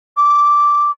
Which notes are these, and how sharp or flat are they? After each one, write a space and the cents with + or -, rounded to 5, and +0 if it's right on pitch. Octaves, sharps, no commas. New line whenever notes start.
D6 -5